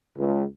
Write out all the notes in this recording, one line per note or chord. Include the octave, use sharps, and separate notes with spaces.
C#2